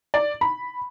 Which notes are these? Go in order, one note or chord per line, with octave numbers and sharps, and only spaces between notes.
D5
B5